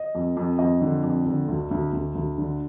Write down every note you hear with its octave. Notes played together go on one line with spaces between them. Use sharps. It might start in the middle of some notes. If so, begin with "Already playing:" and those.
Already playing: D#5
F2
F2
F2 D#5
D3
F2
D3
D2
D2
D2
D2
D3